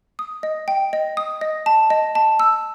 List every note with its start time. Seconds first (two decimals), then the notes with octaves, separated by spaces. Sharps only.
0.19 D#6
0.43 D#5
0.68 G5
0.93 D#5
1.17 D#6
1.41 D#5
1.66 A5
1.90 D#5
2.15 A5
2.40 E6